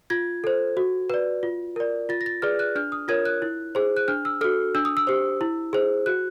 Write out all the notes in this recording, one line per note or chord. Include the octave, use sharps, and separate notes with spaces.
F4 G#6
A4 C5
F#4
B4 D5
F4
A#4 D5
F4 A6
A#6
A6
G#4 B4 D5 F6
F#6
D4 F6
D#6
F4 A#4 C#5 G#6
F#6
E4
G#4 C5
F#6
D4 F6
E6
F#4 A4 F6
D4 E6
D#6
E6
G4 C5
E4
G#4 C5
F#4 F#6